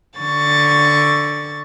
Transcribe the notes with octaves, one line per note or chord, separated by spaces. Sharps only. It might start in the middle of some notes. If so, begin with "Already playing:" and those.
D3 C#6 A6